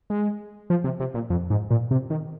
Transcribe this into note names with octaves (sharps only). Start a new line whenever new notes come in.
G#3
F3
C3
C3
A#2
F2
G#2
A#2
C3
D#3